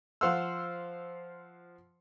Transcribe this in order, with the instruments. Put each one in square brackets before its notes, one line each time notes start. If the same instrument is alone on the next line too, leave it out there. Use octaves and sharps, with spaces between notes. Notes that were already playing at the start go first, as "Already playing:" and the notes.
[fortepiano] F3 C5 F5 F#5 C6 E6